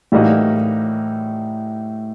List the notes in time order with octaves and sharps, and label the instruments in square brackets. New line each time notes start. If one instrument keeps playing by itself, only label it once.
[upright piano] A2 [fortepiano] E3 G3 A#3 D#4 F#4